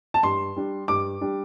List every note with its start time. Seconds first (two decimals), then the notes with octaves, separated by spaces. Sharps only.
0.14 A5
0.23 G2 C6
0.56 G3 D4
0.88 G2 D6
1.21 G3 D4